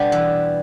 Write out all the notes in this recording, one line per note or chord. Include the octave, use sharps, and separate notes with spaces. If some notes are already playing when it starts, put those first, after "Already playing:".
Already playing: B2 G3 B3 D4
E3